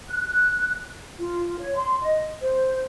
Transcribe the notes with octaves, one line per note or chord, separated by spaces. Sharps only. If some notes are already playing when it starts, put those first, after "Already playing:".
F#6
F4
C#5
C6
D#5
C5